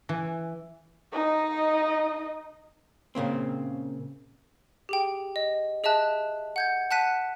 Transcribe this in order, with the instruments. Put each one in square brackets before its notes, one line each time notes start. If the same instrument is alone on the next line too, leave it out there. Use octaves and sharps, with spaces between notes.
[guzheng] E3
[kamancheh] D#4 D#5
[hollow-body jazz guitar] A#2 C#3 A#3 C4
[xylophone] G4 G#4 G5
D#5
G#4 D#5 E5 A5 F#6
F#5 G6 G#6
F#5 A5 F#6 B6 D#7